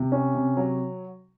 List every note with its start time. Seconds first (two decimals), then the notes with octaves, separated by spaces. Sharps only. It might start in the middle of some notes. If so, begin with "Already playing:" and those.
Already playing: C3
0.12 C#4
0.35 C3
0.57 F#3